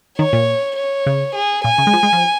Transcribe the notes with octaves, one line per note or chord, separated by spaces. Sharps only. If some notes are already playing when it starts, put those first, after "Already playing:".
D#3 C#5
A#2
C#5
C#3
G#4
A#2 G#5
C#3
G#3
F3
G#3
F3